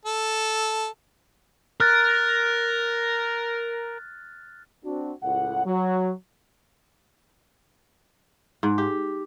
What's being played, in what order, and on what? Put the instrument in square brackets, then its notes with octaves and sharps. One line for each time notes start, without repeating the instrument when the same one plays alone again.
[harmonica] A4
[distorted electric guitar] A#4 [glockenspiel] F6 F#6 A6
[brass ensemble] C4 D4 F#4
C#2 A2 F#5
F#3
[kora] G#2
G4